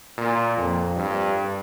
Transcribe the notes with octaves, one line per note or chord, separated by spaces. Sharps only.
A#2
F2
G2